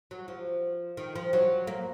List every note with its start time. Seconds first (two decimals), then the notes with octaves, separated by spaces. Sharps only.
0.11 F#3
0.28 F3
0.97 D#3
1.16 F3
1.33 F#3
1.67 A#3